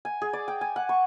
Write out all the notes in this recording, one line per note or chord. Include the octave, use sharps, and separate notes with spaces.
G#5
G#4
D5
G5
G#5
F#5
C#6